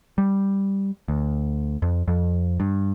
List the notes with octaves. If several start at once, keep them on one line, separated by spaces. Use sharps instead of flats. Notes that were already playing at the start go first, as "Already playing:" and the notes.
G3
D2
F2
F2
G2